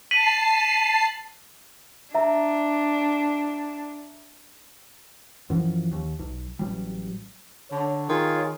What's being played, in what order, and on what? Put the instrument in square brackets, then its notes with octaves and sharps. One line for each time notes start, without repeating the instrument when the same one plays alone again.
[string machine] A5 C7 [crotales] B6 D#7 F#7
[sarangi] D4 [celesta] E5 A#5
[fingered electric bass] F#2 E3 F3
D#2
B1
A1 F#3 G3
[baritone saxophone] D3 [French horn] C#5
[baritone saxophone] D#3 [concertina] F4 G#4